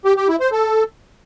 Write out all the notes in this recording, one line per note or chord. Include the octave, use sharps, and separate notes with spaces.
G4
G4
E4
C5
A4